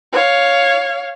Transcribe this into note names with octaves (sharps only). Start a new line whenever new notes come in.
C#5 F5